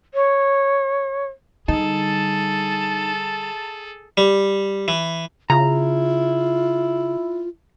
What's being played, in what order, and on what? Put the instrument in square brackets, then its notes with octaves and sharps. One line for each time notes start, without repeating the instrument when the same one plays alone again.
[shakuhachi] C#5
[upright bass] D3 G3 [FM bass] D#4 [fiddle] G#4 A4 [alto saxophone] A5
[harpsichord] G3
E3
[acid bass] C#3 [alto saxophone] E4 [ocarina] F4 [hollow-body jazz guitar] A#5